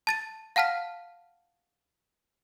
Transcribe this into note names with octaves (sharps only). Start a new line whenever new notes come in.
A5 A6 D#7
F5 F#5 A5 F6 B6